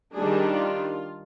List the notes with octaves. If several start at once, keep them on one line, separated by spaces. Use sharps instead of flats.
D#3 G3 D4 G#4
F4